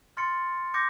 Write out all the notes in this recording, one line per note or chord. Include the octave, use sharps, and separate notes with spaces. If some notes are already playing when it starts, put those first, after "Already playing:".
C6 F6 A6 C#7
D6 G6 A#6 C#7